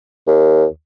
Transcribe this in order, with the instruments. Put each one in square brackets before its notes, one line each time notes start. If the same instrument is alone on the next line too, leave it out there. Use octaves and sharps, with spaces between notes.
[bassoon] D#2